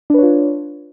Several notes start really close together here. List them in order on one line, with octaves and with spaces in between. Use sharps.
D4 B4 C#5 F4